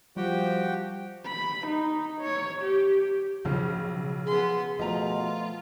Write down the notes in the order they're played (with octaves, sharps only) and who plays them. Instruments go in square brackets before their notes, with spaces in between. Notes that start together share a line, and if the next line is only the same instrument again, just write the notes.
[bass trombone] F3 [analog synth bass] G3 [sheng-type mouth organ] F#4 G4 G5
[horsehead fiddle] B5
D#4
C#5
G4
[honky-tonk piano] B1 C#3 [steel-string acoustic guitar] F3
[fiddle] B3 C6 [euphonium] G#4
[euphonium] B2 [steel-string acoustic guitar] F3 A3 [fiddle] F4 [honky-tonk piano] D#5 A#5